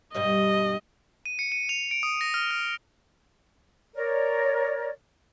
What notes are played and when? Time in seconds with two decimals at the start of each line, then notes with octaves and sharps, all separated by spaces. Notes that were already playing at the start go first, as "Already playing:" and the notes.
0.14 G2 B2 G3 D#5
1.26 D#7
1.39 C#7
1.52 D#7
1.69 F7
1.91 D7
2.03 D#6
2.21 A#6
2.34 F6
2.51 F6
3.95 A#4 C#5 D5